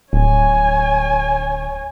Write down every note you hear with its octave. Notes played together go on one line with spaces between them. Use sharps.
D1 C#5 G#5